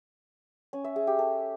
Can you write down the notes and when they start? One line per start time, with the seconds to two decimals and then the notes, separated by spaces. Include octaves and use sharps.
0.73 C#4
0.84 E5
0.96 G#4
1.07 G4
1.19 A4